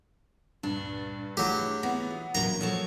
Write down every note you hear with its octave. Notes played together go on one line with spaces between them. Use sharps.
C#2 G2 A#2 D4
F#3 A3 E4 F4 G4 G#4
E3 B3
A#2 E3 F#3 A#3 D4 A#4 A#5
F3 F#3 A4 C#5